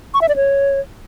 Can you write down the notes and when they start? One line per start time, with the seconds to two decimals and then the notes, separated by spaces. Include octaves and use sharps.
0.14 C#6
0.21 E5
0.29 D5
0.36 C#5